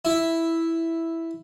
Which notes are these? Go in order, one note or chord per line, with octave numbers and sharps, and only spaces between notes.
E4